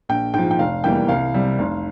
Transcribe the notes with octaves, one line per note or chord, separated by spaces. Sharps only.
A#1 G5
G#2 F3 G5
G5
F1 F5
E2 E3 G3 A#3 G5
C2 F5
C3 G3
F1